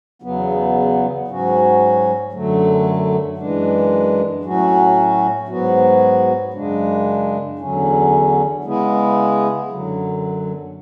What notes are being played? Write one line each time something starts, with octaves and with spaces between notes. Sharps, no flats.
E2 C#3 F#3 B3
G#2 F#3 C#4 F#4
F#2 D3 F#3 A3
F#2 E3 G#3 D4
A2 F#3 C#4 F#4
G#2 F#3 B3 F#4
F#2 C#3 G#3 D4
E2 D3 F#3 C#4
C#3 G#3 B3 E4 G#4
F#2 D3 F#3